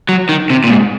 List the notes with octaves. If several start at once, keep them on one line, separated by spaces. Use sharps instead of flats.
F#3
D#3
C3
A#2
G#2